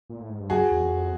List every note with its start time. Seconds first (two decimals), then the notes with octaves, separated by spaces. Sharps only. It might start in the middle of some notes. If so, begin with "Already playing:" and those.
0.10 A#2
0.20 A2
0.29 G#2
0.40 G2
0.50 F#2 F#4 G#4
0.71 E2
0.83 F2